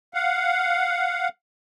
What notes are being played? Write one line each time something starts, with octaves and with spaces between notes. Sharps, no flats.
F5 F#5